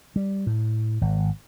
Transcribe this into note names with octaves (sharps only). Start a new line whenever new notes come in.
G3
A2
G#1